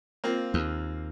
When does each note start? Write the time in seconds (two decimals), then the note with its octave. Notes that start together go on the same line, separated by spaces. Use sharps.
0.24 A#3 C4 F4
0.54 D#2